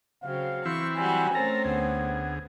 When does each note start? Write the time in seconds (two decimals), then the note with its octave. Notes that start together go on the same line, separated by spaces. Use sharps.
0.24 C#3 F#3 C4 F5
0.65 E3 C4 E4 C#6
0.96 F#3 G3 F#4 G#5
1.35 A3 C4 C#4 A4 A#4 A#5
1.65 D2 B3 G#4